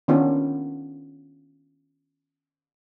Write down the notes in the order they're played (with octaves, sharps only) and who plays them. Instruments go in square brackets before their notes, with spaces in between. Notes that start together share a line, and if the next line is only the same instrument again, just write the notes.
[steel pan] D#3 B3 C#4 D4 F4